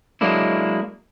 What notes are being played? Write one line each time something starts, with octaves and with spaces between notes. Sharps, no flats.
F#3 G#3 A#3 D4 E4